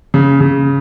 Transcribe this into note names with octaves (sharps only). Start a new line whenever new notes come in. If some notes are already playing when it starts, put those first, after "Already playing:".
C#3
C#3